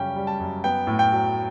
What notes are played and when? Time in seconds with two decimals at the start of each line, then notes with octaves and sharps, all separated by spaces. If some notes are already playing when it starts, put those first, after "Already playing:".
Already playing: F#2 C#3 G3 C#4 G5
0.16 G3
0.27 A5
0.40 F#2
0.64 B3 G5
0.87 A2
0.99 G5
1.12 F#3